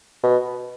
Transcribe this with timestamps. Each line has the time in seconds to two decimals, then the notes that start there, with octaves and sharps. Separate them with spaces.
0.23 B2